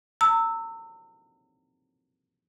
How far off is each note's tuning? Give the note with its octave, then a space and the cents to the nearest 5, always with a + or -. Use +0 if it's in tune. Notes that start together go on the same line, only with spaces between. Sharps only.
A#5 -40 E6 -5